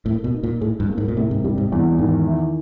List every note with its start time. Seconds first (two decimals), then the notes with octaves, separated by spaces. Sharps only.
0.06 A2 A#3
0.24 B2
0.34 D#4
0.43 A#2
0.61 A2 G#4
0.80 G2
0.89 A#3
0.98 G#2
1.08 A#2
1.17 A2 C3
1.31 G#2
1.44 G2 G3
1.58 G#2
1.72 E2 G2
1.99 G#2 D#3
2.27 E4